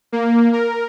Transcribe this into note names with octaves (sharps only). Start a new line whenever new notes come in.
A#3
A#4